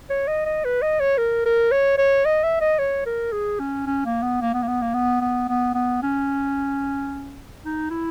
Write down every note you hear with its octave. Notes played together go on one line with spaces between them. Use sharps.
C#5
D#5
D#5
B4
D#5
C#5
A#4
A#4
C#5
C#5
D#5
E5
D#5
C#5
A#4
G#4
C#4
C#4
A#3
B3
A#3
B3
A#3
B3
A#3
B3
B3
B3
B3
C#4
D#4
E4